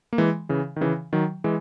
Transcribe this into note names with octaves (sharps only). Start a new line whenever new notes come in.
A#3
E3 G#3
C#3 E3
D#3
C#3 E3
D#3 F#3
E3 G#3